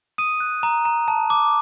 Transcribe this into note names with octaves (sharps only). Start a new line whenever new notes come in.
D#6 D#7
F#6
A#5
A#5
A5
D6